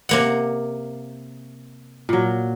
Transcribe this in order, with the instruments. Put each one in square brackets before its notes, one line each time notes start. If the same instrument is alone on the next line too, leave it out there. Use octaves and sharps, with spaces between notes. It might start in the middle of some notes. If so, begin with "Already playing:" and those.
[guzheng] C3 A#3 F#5
[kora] A#2 F#3